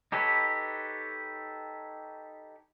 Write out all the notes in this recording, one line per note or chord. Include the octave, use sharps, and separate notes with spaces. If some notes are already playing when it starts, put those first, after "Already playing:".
D#4 G4 A4 B4 C#5